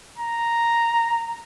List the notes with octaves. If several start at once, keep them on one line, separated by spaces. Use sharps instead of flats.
A#5